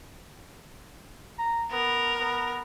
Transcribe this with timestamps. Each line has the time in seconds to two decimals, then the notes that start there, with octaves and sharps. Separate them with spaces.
1.38 A#5
1.72 B3 A#4
2.20 B3